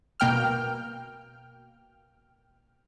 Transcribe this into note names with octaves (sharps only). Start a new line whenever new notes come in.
B2 A#3 G5 F6